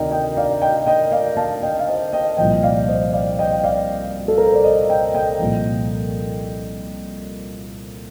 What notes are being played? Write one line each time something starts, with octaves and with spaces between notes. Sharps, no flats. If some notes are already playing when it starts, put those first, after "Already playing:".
Already playing: D2 C3 D#3 A#4 D5 D#5 G5
D#5 G5
D5 F5
D#5 G5
D#5 G5
D5 F5
F5 A5
D#5 G5
F5
C5 D#5
D#5 G5
C2 A#2 F3 D#5 G5
D5 F5
C5 D#5
D5 F5
D#5 G5
G5
D5 F5
A4
A#4
C5
D5
C5 D#5
D#5 G5
D#5 G5
C2 A#2 F3